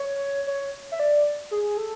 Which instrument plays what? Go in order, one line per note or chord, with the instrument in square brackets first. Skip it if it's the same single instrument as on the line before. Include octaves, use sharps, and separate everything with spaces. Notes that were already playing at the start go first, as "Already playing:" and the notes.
Already playing: [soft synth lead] C#5
C#5
E5
D5
G#4
A4